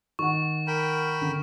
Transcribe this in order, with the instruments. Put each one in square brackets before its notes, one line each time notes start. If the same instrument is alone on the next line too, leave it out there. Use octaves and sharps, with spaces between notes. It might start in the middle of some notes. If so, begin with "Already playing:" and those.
[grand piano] D#3 F#5 [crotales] C#6
[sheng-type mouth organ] A#4 G5 B5
[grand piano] D3